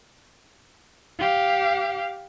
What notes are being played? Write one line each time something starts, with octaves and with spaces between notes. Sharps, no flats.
G4 F5